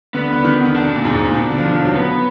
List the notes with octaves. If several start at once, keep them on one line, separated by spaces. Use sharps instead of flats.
D3 B3
D3
D#3
D#3
D3 D4
B2
A#2
G#2 D#4
A#2
G#2
A#2
B2 D4
D3
F3
D#3
F3
F#3
B3